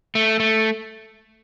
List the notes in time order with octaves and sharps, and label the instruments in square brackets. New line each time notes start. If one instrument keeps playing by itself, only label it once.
[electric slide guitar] A3
A3